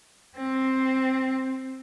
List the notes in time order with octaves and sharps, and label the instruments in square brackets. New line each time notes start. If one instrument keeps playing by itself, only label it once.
[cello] C4